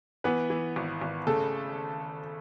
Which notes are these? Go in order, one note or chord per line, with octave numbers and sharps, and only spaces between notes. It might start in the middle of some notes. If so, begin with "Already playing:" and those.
E3 B3 B4
E3
G#1
G#1
C#3 A3 A4